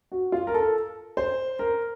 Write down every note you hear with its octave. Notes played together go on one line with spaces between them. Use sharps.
F#4
F4
A#4
A4
C5
A#4